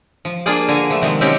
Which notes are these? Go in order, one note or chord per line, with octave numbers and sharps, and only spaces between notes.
F3
A#3 D4 F4 G#4 D5
D3 G#5 A#5
F3 A3
C3 D#3 F3 G#3
F#3 G#3 C4 C#4 G4